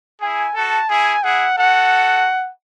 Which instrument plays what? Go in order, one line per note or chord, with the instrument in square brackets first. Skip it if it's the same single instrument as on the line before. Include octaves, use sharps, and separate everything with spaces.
[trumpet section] E4 G#4 [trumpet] G#5
[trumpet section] F#4 A4 [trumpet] A5
[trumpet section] E4 G#4 [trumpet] G#5
[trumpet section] E4 G#4 [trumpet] F#5
[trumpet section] F#4 A4 [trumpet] F#5